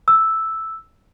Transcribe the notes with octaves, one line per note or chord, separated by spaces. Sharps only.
E6